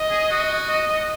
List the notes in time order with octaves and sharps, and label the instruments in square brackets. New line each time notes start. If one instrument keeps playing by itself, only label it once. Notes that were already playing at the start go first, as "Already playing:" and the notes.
Already playing: [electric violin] D#5
[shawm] G#4
F#4
[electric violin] D#5